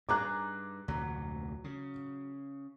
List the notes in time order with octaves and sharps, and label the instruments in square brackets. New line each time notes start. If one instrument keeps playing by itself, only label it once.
[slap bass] G2 [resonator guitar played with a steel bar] D#4 G#4 A#5 [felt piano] D6 F#6
[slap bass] F1 D2 A#2 [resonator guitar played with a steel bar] F#3
[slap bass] C#3